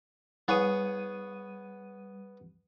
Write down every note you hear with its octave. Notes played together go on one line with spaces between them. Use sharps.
G3 B3 G#4 C#5 D#7